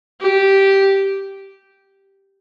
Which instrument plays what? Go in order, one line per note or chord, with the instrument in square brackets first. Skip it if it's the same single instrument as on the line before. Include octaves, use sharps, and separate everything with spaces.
[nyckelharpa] G4